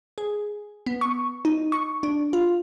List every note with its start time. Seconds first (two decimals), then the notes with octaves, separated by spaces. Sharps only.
0.18 G#4
0.86 B3
1.01 C#6
1.45 D#4
1.72 C#6
2.03 D4
2.33 F4